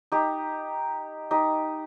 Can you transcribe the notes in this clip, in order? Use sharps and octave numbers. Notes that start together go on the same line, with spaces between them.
D#4 G4
D#4 G4